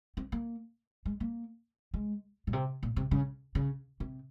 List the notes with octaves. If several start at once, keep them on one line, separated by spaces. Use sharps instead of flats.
C4
A#3
G#3
A#3
G#3
A#2
C3
A#2
C3
C#3
C#3
C3